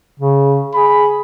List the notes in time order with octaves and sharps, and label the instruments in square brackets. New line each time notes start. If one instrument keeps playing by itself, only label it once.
[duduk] C#3
[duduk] G#4 [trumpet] B5